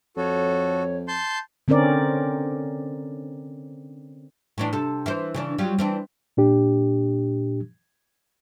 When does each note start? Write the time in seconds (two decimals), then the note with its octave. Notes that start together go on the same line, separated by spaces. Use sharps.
0.17 F2 F#4 A4 C#5
1.08 A5 C6 G6
1.68 D3 C4 C#4 A#4 D5
4.58 A2 E3 D4
4.73 C3 A4
5.06 E3 E4 C5
5.34 C#3 E3 D4
5.58 F#3 G3 F4
5.79 E3 C4 D4
6.37 A#2 D4 G4